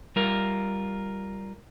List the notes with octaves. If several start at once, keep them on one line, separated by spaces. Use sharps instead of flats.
G3 F4 A#4